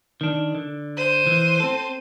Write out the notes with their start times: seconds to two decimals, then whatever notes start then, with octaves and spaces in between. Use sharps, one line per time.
0.21 D#3 D4
0.55 D3
0.97 C5 D#7
1.27 E3
1.60 C4 A4